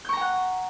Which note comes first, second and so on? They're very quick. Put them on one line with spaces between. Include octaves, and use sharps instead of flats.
G6 C#6 A#5 G5 F#5